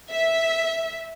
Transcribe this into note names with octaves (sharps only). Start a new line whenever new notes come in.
E5